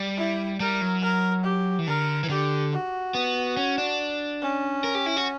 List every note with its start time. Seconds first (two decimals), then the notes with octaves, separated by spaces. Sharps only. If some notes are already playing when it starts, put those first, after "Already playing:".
Already playing: G3
0.17 E4
0.60 G3 A#4
0.81 F#3
1.03 A#4
1.44 G4
1.79 E3
1.87 D3 A#4
2.24 E3
2.29 D3 G4
2.73 F#4
3.14 B3
3.57 C#4
3.78 D4
4.42 C#4
4.84 A#4
4.95 G4
5.06 E4
5.17 F#4